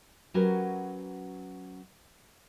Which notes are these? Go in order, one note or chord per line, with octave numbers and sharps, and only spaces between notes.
F#3 C#4 F#4 G4 A#4 B4